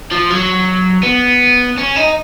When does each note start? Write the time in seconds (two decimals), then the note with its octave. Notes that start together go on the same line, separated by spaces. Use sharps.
0.11 F3
0.30 F#3
1.03 B3
1.78 C#4
1.96 D#4